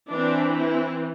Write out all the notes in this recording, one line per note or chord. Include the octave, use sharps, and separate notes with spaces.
E3 C4 D4
E4